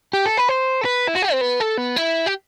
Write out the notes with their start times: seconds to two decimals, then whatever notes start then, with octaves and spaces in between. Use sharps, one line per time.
0.13 G4
0.26 A4
0.37 B4
0.48 C5
0.81 A4
0.85 B4
1.08 E4
1.15 F#4
1.23 G4
1.32 C4
1.41 B3
1.60 A4
1.78 B3
1.97 E4
2.27 G4